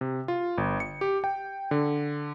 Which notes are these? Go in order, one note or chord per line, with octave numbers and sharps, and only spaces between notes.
C3
F4
G1
C#7
G4
G5
D3